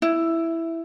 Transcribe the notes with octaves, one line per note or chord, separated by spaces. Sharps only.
E4